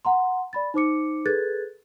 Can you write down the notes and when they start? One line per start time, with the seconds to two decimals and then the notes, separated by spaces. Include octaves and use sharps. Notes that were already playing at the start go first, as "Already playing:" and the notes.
0.05 F#5 A#5 C6
0.53 D5 B5 A6
0.74 D#4 C5 D6 C#7
1.25 G#4 A4 B4 F#6 G#6 A6